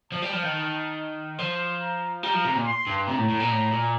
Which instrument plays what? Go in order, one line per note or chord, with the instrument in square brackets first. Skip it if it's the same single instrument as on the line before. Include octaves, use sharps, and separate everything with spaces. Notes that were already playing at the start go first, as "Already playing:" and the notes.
[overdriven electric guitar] F3 [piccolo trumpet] A5
[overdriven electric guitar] G3
F3
D#3
[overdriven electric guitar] F3 [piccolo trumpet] C6
[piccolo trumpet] A#5
[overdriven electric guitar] G3 [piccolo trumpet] A#5
[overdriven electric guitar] F3
C3
A#2
[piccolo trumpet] C6
[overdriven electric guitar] G2
[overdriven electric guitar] C3 [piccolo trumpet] A#5
[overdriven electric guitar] A2
A2
A#2
A2
A#2